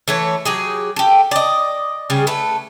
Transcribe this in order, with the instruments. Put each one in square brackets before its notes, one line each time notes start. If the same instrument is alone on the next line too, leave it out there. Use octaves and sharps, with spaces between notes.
[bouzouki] E3 A3 C#5
F#3 G4 G#4
G4 A4
D5 D#5
C#3 G3 G#4
A3 B4